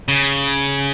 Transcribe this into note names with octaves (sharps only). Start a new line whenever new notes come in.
C#3